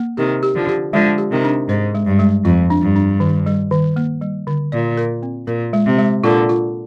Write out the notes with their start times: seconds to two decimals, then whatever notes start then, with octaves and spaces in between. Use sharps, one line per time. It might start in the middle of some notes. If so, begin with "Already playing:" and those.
Already playing: A#3
0.17 C3 D#3 G4
0.43 G4
0.55 D3 F3
0.69 G4
0.93 D3 F3 G#3
1.18 G4
1.31 C3 D#3
1.44 D4
1.69 G#2 C5
1.95 G#3
2.07 G2
2.19 G#3
2.45 F2 F4
2.70 D4
2.82 G2
2.95 D4
3.20 D#3
3.46 G3
3.71 D#3
3.96 A#3
4.21 G3
4.47 D3
4.72 A#2 D5
4.97 A#4
5.23 C4
5.47 A#2 A#4
5.73 G#3
5.86 C3
5.98 G#3
6.23 A#2 D3 F4
6.49 F4